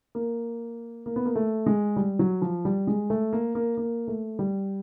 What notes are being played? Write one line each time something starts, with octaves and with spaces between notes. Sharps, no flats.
A#3
A#3
B3
A#3
A3
G#3
G3
F#3
F3
G3
G#3
A3
A#3
A#3
A#3
A3
G3